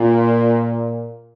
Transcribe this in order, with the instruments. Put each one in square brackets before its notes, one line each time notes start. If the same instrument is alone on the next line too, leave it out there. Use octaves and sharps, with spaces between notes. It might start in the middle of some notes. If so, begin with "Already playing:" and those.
Already playing: [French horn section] A#2